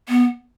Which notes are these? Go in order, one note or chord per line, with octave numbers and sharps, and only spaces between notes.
B3